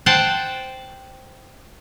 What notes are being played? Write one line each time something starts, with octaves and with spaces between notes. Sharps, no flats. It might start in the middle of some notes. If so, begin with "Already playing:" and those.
C5 F#5 G5 A5